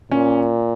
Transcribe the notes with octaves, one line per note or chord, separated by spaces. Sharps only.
A#2 C#4